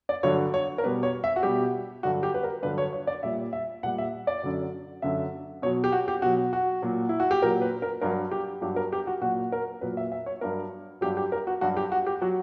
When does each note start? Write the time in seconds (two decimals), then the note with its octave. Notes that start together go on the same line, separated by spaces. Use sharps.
0.09 D5
0.23 G2 D3 F#3 C#5
0.54 C#5
0.78 A#4
0.84 B2 G3 B4
1.03 C#5
1.24 E5
1.36 F#4
1.43 B2 G3 G4
2.03 G2 D3 F#3 F#4
2.23 G4
2.34 B4
2.43 A#4
2.63 G2 D3 F#3 B4
2.78 C#5
2.93 C#5
3.07 D5
3.23 A#2 G3 E5
3.53 E5
3.83 A#2 F#5
3.86 G3
3.98 E5
4.27 D5
4.43 F#2 D3 F#3
5.02 F#2 D3 F#3 E5
5.62 B2 C#5
5.66 F#3
5.84 G4
5.92 F#4
6.08 G4
6.22 B2 F#3 F#4
6.53 F#4
6.82 A#2 F#3
7.09 E4
7.20 F#4
7.31 G4
7.42 A#2 F#3 A#4
7.62 B4
7.82 A#4
8.01 G2 F#3 A#4
8.31 G4
8.61 G2 F#3 G4
8.76 A#4
8.93 G4
9.07 F#4
9.21 A#2 F#3 F#4
9.52 A#4
9.81 A#2 F#3 B4
9.97 E5
10.12 E5
10.26 C#5
10.41 G2 F#3 A#4
11.01 G2 F#3 G4
11.17 G4
11.32 A#4
11.47 F#4
11.61 G2 F#3 F#4
11.77 G4
11.92 F#4
12.07 G4
12.21 F#3 F#4